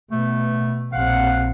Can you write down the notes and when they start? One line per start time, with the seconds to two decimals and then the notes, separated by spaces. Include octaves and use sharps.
0.12 B2 A3
0.93 A#1 C4 F5 F#5